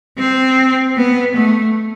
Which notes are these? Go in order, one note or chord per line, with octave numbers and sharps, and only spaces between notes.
C4
B3
A3